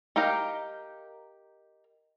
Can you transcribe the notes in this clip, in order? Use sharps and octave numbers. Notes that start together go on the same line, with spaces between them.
D#4 G4 A#4 F5 A#5